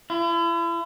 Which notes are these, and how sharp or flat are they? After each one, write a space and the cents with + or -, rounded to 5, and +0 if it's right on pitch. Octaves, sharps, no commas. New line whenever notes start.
E4 +40